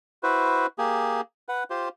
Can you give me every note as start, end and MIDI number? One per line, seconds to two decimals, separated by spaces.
0.23 0.66 64
0.23 0.66 66
0.23 0.66 71
0.23 0.66 72
0.78 1.21 58
0.78 1.21 67
0.78 1.21 68
1.49 1.64 71
1.49 1.64 78
1.70 1.89 65
1.70 1.89 67
1.70 1.89 72